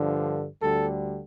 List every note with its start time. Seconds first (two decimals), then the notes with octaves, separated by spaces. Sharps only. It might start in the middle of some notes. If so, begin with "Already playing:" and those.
Already playing: G2 D3 F3
0.62 D2 D3 G3 A4